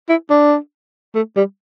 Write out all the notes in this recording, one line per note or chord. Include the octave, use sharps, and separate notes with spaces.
E4
D4
A3
G3